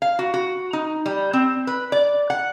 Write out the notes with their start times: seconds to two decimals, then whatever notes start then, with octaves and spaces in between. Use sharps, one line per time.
0.02 F5
0.19 F#4
0.34 F#4
0.73 D#4
1.06 G3
1.33 C4
1.67 B4
1.92 D5
2.30 F#5